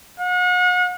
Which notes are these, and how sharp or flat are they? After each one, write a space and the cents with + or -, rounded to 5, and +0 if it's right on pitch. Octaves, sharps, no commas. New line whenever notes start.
F#5 -40